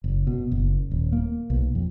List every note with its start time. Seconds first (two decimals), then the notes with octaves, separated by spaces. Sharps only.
0.04 F#1
0.27 B2
0.52 F#1
0.91 D#1
1.12 A#3
1.50 B1
1.75 F2